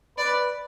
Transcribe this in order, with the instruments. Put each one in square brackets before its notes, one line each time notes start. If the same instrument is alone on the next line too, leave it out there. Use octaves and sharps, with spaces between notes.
[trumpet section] B4 [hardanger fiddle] D5